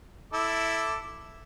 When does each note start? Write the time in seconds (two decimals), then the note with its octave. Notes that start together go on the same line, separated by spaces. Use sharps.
0.33 E4 A4 D6